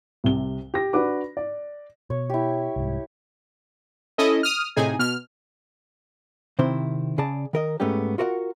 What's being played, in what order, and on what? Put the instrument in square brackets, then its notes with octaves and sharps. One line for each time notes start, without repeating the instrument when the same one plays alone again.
[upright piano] C2 C3 G7
G4 A#6
D4 F#4 B4 D6
D5
[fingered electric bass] B2 [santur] C#5
[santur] E4 G4
[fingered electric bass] C2 G#2
[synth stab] C#4 E4 A4 D#5
D#6 F6
A2 C3 D#4 G#4 G#5
B2 F6
[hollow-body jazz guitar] C3 D#3 C4 E4 C5
C#3 G#4 D5 A5
D#3 A#4 D#5
G#2 A3 B3 C#4 G4
F4 F#4 A#4 D5 F#5